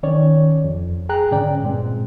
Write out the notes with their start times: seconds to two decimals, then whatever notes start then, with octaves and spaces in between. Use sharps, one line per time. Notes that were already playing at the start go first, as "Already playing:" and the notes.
0.03 D#3 C#4 C#5 D5
0.64 F2
1.09 G#4 G5 A#5 F#6
1.31 G#2 D3 C#4 D5 G5
1.63 G2 A#2 G#3 C4